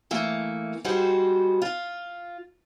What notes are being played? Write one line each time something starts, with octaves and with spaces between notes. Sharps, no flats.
E3 A3 A#3
G3 G#3 D#4 F#4 C5
F4